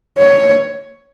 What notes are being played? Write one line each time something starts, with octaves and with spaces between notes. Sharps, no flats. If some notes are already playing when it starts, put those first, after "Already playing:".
C#5